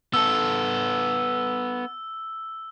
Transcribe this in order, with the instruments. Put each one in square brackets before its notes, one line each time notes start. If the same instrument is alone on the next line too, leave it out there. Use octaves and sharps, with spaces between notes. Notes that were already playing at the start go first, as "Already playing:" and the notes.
[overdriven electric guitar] B3 A4 [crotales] E6